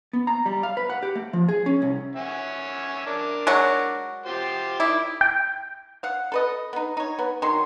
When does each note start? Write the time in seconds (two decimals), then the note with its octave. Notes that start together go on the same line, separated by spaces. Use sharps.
0.13 B3
0.27 A#5
0.46 G3
0.63 F5
0.77 B4
0.90 F#5
1.03 G4
1.15 A3
1.33 F3
1.49 G#4
1.66 C#4
1.82 C2
2.16 C#4 E5 F#5
3.07 D4 A#4
3.47 F#3 G#3 F#4
4.26 F4 G4 C5
4.80 D#3 E4 D5 D6
5.21 G5
6.03 F5 F#5
6.32 A4 B4 D#5
6.73 B3 D#4
6.97 D#4 C#5
7.19 B3
7.42 D#3 F#3 G#4 C6